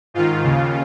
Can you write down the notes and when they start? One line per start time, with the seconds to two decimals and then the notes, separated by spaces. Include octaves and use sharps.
0.14 G#2 D#3 F4
0.43 D#2 C#3